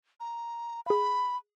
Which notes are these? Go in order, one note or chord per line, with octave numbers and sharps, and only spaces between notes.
A#5
G#4 F5 B5